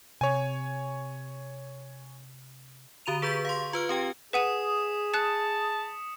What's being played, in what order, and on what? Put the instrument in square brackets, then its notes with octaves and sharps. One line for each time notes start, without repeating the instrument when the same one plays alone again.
[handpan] C3 [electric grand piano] C#5 G#5
[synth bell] D3 F#4 A#5 D#7 F7
G#4 B4 C#6 G6 B6
F5 C6
F4 B4 F6
C4 G4 G5
[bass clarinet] G#4 [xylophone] B4 F#5 D#7 [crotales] D#6 B6 E7
[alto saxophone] A5 [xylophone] F#6 E7 [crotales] C#7